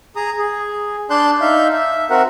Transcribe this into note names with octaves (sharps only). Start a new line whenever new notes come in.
G#4 A#5 D#6
G#4
D4 D5 A5 C6 F#6 G6
D#4 E5 F5 G6
E5
C4 F#4 A#4 E5 F#5